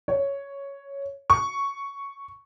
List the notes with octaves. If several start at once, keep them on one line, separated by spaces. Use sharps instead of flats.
C#5
C#6